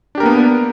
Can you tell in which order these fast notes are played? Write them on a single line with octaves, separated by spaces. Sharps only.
D4 G4 A#4 A#3 B3